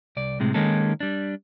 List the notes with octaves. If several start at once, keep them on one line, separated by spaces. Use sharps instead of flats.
C2 D5
A2 C3 G#3
D#3 G#3 A#3 C#4 D#4 A4
G3 D4